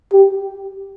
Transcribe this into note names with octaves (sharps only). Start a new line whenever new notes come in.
G4